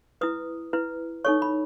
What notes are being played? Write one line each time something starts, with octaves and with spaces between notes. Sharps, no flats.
E4 B4 D#6
E4 B4
D#4 A4 C#5 C#6
B5